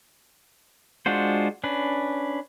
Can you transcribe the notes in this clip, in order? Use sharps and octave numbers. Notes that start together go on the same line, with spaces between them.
G#3 D4 F4 F#4 C5
C#4 D4 B4